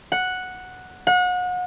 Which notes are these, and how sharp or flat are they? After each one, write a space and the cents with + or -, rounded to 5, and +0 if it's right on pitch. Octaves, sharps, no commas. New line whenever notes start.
F#5 -5
F#5 -35